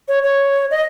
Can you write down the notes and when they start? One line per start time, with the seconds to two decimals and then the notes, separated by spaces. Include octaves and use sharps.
0.08 C#5
0.23 C#5
0.71 D#5